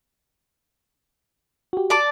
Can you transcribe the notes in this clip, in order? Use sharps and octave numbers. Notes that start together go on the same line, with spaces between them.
F#4 G4
D5 A5 D6